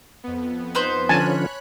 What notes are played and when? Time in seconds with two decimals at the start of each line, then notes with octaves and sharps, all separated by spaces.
0.24 F2 B3
0.75 D#4 B4 C5
1.09 D3 F3 C#4 C#5 G#5 A5 B5 F#6